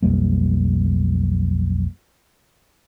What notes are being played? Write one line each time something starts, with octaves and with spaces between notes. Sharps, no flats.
B1 F2 G3 A#3